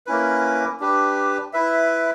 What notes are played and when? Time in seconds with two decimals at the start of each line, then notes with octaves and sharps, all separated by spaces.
0.07 A#3 C#4 E4 B4
0.80 D4 G4 B4
1.53 E4 B4 E5